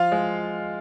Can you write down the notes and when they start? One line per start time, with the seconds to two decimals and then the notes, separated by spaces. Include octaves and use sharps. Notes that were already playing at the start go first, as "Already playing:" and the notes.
Already playing: F3 F4 F5
0.12 G#3